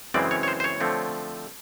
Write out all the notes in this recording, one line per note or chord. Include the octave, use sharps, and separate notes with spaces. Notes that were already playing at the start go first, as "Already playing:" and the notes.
F#2 C#3 E3 G#3 C4 D5
C#5
C#5
C5
C5
C#5
D3 F3 A3 C4